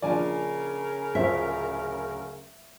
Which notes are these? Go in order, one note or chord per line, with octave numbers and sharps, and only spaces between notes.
A#1 C#3 D4 F4 A#4 D5 G#5 A5
D1 F4 C5 E5